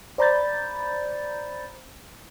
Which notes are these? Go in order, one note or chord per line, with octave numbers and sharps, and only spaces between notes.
C5 D5 A#5 B5 G6 A6